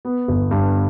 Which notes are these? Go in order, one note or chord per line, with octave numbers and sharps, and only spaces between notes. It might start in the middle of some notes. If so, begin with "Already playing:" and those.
B3
G1
G2